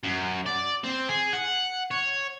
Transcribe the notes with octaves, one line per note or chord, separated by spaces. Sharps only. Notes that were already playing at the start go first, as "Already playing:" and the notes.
F#2
D5
C4
G#4
F#5
C#5